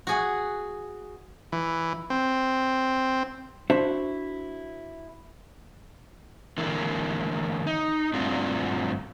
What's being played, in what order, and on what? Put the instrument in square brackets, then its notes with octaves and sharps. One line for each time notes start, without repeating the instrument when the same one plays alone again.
[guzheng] F#4 G#4 F#5
[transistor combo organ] E3
C4
[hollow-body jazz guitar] D4 E4 F#4 C5 E5
[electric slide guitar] D3 E3 A#3 E4
D#4
G2 A3 C4 D4 F4 F#4